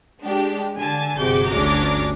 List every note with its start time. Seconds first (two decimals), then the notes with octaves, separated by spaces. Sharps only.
0.21 G#3 D4 G4
0.77 D3 G#5 A5
1.17 G1 C3 F#4 G#4 D6 G6
1.49 G1 D2 C#4 D4 A#5 D6